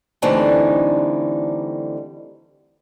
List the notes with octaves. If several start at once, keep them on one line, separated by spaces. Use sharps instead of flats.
D3 E3 G3 A3 C4 D#4